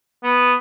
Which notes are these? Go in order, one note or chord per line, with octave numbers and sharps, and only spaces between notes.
B3